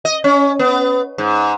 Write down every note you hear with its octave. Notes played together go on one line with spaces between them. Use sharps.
D#5
C#4
B3
G#2